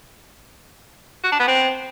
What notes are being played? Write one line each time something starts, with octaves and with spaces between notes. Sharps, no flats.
F#4
D4
B3
C4